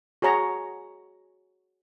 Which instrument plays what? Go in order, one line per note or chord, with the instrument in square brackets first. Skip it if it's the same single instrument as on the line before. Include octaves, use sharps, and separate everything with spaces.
[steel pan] F#4 G#4 C#5 A#5 C#6